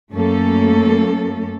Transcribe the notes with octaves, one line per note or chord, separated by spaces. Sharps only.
F#2 A3 A#3 C#4 A4